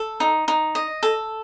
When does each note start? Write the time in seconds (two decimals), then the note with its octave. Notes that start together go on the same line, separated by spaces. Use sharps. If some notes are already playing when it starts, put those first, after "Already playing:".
Already playing: A4
0.20 D#4
0.48 D#4
0.75 D#5
1.03 A4